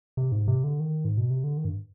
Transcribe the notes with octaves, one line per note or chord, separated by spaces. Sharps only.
C3
G#2
C3
D3
D#3
G#2
B2
C3
D3
D#3
G2